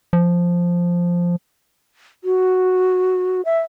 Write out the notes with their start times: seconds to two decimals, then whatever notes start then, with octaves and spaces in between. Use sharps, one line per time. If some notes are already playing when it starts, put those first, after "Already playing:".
0.13 F3
2.24 F#4
3.45 E5